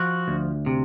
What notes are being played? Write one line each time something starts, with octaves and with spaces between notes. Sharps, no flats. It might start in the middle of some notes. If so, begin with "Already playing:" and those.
Already playing: F3 F#4
D2
C3